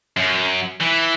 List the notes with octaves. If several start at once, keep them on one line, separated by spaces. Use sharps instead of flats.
F#2
E3